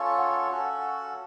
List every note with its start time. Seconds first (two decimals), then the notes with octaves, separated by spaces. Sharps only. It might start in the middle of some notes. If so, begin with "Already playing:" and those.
Already playing: C#4 F4 A4 C#5 F5
0.19 F#5
0.51 C#4 F#4 A4